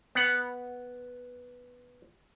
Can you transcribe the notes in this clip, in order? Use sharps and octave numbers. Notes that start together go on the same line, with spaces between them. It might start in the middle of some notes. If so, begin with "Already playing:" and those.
B3 F#5